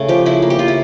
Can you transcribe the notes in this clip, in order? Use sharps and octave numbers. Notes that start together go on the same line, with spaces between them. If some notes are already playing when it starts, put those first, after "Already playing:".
Already playing: C#3 A3
F3 G4
C#3 E4
A#3
G4
C#3 F4
E4